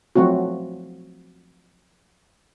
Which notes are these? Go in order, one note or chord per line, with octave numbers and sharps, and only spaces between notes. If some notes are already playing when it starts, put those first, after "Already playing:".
F3 F#3 A3 C4 F#4